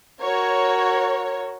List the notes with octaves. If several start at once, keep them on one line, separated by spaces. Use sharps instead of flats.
F#4 A#4 C#5